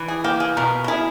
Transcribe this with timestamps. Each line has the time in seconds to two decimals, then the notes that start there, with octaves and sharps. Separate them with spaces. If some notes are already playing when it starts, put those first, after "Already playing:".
Already playing: E3
0.08 G#4
0.24 A#3 G4
0.40 G#4
0.57 B2 A#4
0.84 A#4
0.88 E4 G#4